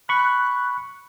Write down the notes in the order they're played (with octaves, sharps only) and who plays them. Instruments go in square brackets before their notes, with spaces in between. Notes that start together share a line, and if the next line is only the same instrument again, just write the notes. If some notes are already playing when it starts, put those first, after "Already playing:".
[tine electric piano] B5 C#6 [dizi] F#6